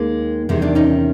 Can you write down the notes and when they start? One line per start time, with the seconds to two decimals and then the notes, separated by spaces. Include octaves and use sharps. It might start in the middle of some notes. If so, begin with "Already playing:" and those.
Already playing: D#2 D#3 G#3 A#3
0.49 E2 C3 D#3 G#3
0.62 C4 D4
0.75 C#4 D#4